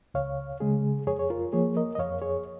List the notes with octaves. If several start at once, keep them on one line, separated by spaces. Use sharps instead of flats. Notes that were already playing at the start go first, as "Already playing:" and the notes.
C#2 C#5 F5
C#3 G#3 G#4
F2 G#4 C#5
C#5
F4 A#4
F3 A#3 G#4 C#5
A#4 D#5
D#5
F2 C#5 F5
G#4 C#5